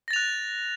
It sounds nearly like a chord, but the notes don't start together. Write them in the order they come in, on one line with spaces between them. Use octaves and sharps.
A#6 A6 F7 F#6